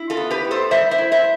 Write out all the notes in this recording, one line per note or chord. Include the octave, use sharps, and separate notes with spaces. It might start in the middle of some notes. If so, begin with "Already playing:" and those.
Already playing: E4
F4 A4
B3
G4 B4
A2
A4 C5
G3 C5 E5
C5 E5
E4
C5 E5